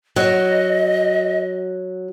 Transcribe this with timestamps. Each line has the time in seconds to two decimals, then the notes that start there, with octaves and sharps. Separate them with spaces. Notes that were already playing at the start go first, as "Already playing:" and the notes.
0.16 F#3 D#5